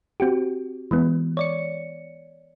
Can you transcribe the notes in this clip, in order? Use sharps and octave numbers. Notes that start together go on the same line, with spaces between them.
C4 F#4 G4
E3 G#3 B3
C#5 D5 C#7